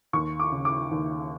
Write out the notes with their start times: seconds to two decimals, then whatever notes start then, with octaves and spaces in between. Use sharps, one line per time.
0.13 D#2 C#6
0.40 D6
0.52 C#3
0.65 D6
0.91 D#2